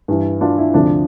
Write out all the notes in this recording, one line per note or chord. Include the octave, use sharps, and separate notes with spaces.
G2 E3
D4 F4
E4
D2 C3 F3 D4